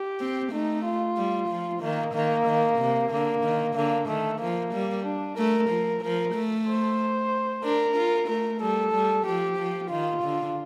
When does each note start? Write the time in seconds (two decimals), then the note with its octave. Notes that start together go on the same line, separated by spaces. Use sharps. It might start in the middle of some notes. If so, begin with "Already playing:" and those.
Already playing: G4
0.20 C4
0.52 A3 D#4
0.85 F4
1.17 G3
1.49 F3
1.81 D#3 A#3
2.14 D#3 A#3
2.46 D#3
2.78 C3
3.11 D3 A#3
3.44 D#3
3.75 D3 A#3
4.08 D#3 A3
4.40 F3 A#3
4.73 G3
5.05 D4
5.37 A3 A#4
5.70 F3
6.02 F3 A#4
6.34 A3
6.67 C5
7.63 D4 A#4
7.96 F4
8.28 A3 A#4
8.61 G3 A4
8.93 G3
9.25 F3 G4
9.58 F3
9.90 D#3 F4
10.23 D3